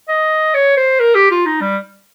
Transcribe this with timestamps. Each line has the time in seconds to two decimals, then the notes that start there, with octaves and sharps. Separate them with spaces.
0.08 D#5
0.54 C#5
0.77 C5
1.00 A#4
1.15 G4
1.31 F4
1.46 D#4
1.61 G3